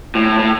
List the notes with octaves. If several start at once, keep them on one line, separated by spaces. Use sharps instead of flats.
A2
A2